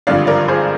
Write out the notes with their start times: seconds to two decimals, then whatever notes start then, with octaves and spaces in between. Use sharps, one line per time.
0.07 G#1 G2 D3 F3 D5 F5
0.27 A#4 D5
0.48 G#4 C5